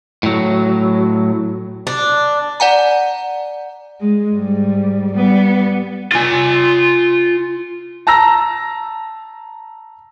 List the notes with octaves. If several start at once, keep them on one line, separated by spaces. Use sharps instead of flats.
A2 F#3
D4
D5 F#5 G#5 A#5
G#3
G#2 G3
G3 B3
F4 G#5
A5 A#5 E6 A#6